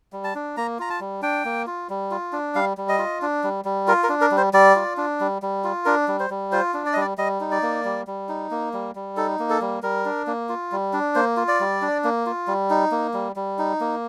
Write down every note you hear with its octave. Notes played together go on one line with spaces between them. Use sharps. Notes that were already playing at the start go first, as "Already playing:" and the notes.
G3
A5
D4
A#3 A#5
F4 A#5
A5
G3
D4 G5
A#3
F4
G3
F4
D4
G3 F5
G3
D#5
F4
D4
G3
G3
F4 A#4
A#4
D4
A#4
G3
C5
G3 D5
F4
D4
G3
G3
F4
D4 A#4
G3
C5
G3
F4 C5
D4
D5
D#5
G3 D5
G3 D#5
D#4
D5
A#3
G3
G3
D#4
A#3
G3
G3
D#4 A4
A#3
A4
G3
G3 A#4
D4
A#3
F4
G3
D4
A#3 C5
F4
D5
G3
D4
A#3
F4
G3
D#4
A#3
G3
G3
D#4
A#3